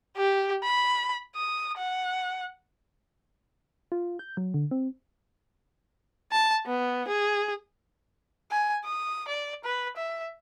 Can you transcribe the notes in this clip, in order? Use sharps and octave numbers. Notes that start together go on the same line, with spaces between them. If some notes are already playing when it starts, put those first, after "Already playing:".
G4
B5
D#6
F#5
F4
G6
F#3
D3
C4
A5
B3
G#4
G#5
D#6
D5
B4
E5